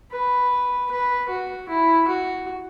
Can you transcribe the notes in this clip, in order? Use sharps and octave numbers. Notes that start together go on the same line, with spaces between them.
B4
B4
F#4
E4
F#4